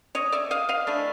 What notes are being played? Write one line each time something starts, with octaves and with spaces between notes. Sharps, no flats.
C#5 D#5
D5 E5
D#5 F5
D#5 F5
E3 A3 D4